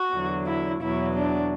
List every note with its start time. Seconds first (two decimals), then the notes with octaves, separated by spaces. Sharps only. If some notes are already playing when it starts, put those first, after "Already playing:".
Already playing: F#4
0.12 E2 D3 F#3
0.47 E4
0.81 E2 B2 F#3 E4
1.15 D4